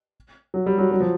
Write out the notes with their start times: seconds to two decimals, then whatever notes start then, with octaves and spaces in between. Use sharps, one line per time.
0.54 F#3
0.66 G3
0.78 F#3
0.92 F#3
1.00 F3